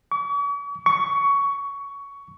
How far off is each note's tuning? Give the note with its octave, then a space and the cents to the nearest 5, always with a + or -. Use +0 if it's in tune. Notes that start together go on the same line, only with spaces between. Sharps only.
C#6 +45
C#6 +15